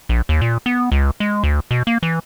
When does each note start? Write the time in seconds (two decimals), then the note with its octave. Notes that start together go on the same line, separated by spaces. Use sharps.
0.09 A#1
0.29 D#2
0.41 A#2
0.66 B3
0.92 C#2
1.20 G#3
1.43 D2
1.71 B2
1.87 A#3
2.03 E3